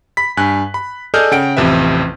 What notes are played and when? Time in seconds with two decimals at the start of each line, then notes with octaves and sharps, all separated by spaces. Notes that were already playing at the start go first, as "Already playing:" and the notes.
0.17 B5 B6
0.37 G2 G#5 F#6
0.74 B5
1.14 G#4 A4 D5 D#5 F6 G6
1.31 C#3 F#5 G5 D7
1.57 A1 F2 C3 B4 E5